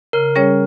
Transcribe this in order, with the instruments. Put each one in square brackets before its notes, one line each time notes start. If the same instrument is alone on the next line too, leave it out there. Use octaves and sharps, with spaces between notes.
[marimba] C#3 [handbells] A#4
[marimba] G3 C#4 G#4 C#5